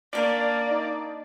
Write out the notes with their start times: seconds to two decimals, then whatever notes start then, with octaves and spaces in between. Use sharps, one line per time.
0.13 A#3 C#4 D4 A#4 D5
0.70 D#4